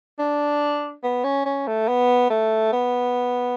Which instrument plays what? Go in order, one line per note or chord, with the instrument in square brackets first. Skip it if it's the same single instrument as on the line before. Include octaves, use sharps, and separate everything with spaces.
[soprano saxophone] D4
B3
C#4
C#4
A3
B3
A3
B3